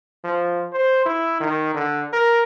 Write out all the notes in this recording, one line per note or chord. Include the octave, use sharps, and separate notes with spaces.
F3
C5
E4
D#3
D3
A#4